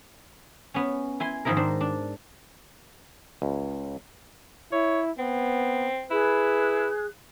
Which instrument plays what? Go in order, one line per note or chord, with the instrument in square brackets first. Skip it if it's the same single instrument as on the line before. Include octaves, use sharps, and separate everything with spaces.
[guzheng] B3 C#4
E4 G#5 C6
G#2 D#3 F3 D#4 E4 A#4
D#3 D4 C5
D4
[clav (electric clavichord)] C#2
[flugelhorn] E4 [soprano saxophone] C#5
[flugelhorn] B3 [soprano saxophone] C4
[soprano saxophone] E4 [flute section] G#4 F#6 [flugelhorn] B4